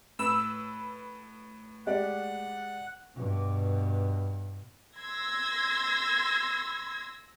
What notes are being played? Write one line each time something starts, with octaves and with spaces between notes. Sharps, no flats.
A2 B4 B5 E6
G#3 G4 D5 F#5
G2 B2
C6 E6 G#6 A#6